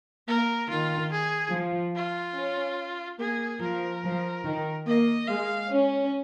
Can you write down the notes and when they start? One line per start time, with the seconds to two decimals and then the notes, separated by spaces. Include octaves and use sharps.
0.28 A#3 A#4
0.70 D#3 F4
1.12 G#4
1.53 F3
1.96 F4
2.37 C#4
3.20 A#3 G#4
3.61 F3 A#4
4.03 F3
4.45 D#3
4.87 A#3 D#5
5.28 G#3 F5
5.70 C#4